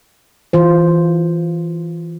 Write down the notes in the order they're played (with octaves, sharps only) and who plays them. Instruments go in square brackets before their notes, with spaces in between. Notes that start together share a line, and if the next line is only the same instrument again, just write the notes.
[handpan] E3 F4 C5